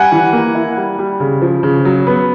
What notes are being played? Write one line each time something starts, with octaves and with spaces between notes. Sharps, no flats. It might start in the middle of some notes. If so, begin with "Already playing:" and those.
Already playing: G3 F#5 G#5
E3
A#3
E4
G3
G3
C#3
F3
C#3
F#3
B3